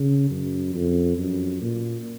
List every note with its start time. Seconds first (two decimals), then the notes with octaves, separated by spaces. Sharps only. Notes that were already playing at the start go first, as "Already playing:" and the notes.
Already playing: C#3
0.30 F#2
0.74 F2
1.17 F#2
1.61 A#2